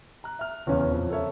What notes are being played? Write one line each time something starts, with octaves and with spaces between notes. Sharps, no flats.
A#5 F#6
E5 F6
D#1 E2 C#3 C#4 C#5
F2
A4 A#4 C#5 E5